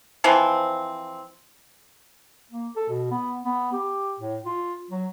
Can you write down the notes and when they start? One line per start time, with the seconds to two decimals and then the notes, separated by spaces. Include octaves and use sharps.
0.24 E3 F3 C4
2.51 A#3
2.76 A4
2.89 B2
3.11 B3
3.45 B3
3.73 G4
4.20 A2
4.45 F4
4.91 F#3